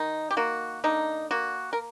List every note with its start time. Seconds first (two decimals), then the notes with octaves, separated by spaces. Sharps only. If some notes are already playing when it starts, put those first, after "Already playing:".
Already playing: D#3 D#4
0.31 G4
0.37 A#3 F#4
0.84 D3 D#4
1.31 A#3 F#4
1.73 A#4